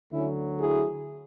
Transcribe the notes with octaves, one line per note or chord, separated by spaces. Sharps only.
D2 D3 F#3 C#4 E4
E4 G#4